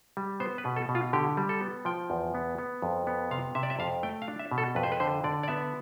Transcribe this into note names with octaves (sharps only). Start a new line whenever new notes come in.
G3
B3 C5
B4
B2
A4
B2
F4
D3 G4
G3
A4
B3
F3 G5
E2
B3
B3
F2
B3
C3 F5
C3 E5
D5
E5
F2 F5
A3 G5
F5
D4
E5
B2
A4
F2 B4
C5
B4
D3 C5
D3 D5
D5
B3 E5